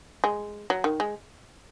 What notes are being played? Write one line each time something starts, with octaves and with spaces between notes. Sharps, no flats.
G#3
F#3
D#3
G#3